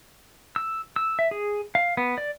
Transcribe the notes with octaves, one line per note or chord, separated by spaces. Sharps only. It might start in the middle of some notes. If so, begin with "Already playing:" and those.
E6
E6
E5
G#4
F5
B3
D5